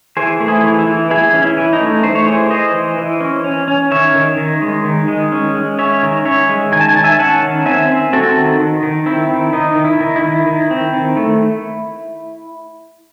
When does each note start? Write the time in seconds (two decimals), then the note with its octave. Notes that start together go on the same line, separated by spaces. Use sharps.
0.17 E3 G#4 C5
0.40 A3
0.48 E4 G#4
0.64 E3
0.79 E4
0.87 E3
1.10 E3 E4 G#4
1.34 C#4
1.42 E4
1.57 E3
1.73 D#4
1.80 A3
2.03 A3 C5
2.15 C#5
2.26 E3 G#4 C5
2.51 E3 C5 D#5
2.74 E3
2.98 E3
3.21 C#4
3.44 C#4
3.68 C#4
3.91 D#3 C#5 E5
4.15 D#3
4.38 D#3
4.62 G#3
4.85 D#3
5.08 G#3
5.32 C#4
5.55 G#3
5.78 C#4 C#5 E5
6.03 D#3
6.25 C#4 C#5 E5
6.49 G#3
6.72 D#3 G#5
6.81 A5
6.89 G#5
6.96 D#3 A5
7.04 E5 G#5
7.19 C#4 F#5 A5
7.42 D#3
7.66 C4 E5 G#5
7.89 C4
8.13 C4 F#4 A4
8.36 D#3
8.60 D#3
8.83 D#3
9.06 C4 E4
9.30 D#3
9.53 D#3 D#4
9.76 D#3
9.85 E4
10.01 D#3
10.16 E4
10.23 D#3
10.46 D#3
10.71 C4
10.93 D#3
11.17 A3